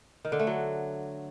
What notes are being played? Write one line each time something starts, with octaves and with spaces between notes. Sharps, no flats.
D#3
D3
A3
F#3